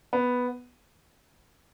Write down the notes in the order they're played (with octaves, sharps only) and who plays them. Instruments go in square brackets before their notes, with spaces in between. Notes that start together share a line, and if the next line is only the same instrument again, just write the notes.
[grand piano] B3